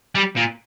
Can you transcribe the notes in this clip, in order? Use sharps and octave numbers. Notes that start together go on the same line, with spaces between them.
G3
A#2